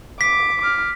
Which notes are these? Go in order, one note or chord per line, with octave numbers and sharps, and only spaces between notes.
D6 B6
D6 F6